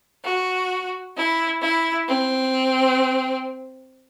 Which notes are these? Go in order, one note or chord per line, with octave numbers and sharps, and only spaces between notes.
F#4
E4
E4
C4